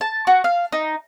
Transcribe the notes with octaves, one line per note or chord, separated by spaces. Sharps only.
A5
F#4
F5
D#4